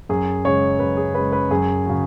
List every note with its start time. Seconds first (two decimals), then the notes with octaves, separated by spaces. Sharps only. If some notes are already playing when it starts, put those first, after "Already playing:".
0.09 F#2 G#4
0.45 C#3 G#3 C#5
0.79 F#2 B4
0.97 G#4
1.15 C#3 G#3 B4
1.33 B4
1.51 F#2 G#4
1.86 C#3 F#3